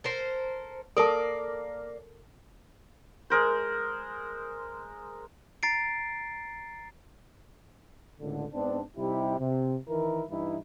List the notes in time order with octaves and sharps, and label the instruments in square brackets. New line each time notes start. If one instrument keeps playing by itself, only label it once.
[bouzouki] A4 A#4 C5
[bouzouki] A#3 D5 [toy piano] A4 A#4 A5
[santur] G#3 A#4 C5
[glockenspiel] A#5 A6 C7 D7
[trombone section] C#2 A2 D3
G#2 B3 C4 D4
C3 G3 D#4 E4 G4
C3
D#3 E3 E4 A#4
G2 E3 D#4 E4